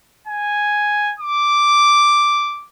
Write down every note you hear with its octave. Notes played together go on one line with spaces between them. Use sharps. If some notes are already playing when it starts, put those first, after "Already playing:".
G#5
D6